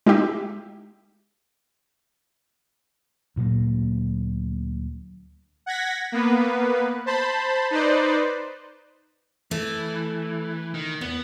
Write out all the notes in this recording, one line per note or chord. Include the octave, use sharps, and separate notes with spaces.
G#3 D#4 E4 G4 E5
D2 A#2 F#3 A#3
F#5 G#6 A#6 B6
A#3 B3 B4
C5 A5 B5
D#4 B4 C5 D5
E3 A3
D#3
E2 B3